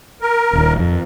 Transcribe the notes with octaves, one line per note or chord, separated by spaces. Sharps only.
A#4
D#1 D#2
F2